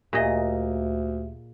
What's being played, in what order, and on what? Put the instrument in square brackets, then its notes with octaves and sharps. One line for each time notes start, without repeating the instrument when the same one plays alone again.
[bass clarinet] D2 [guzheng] A#2 G#4 D#5 [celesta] G4 E5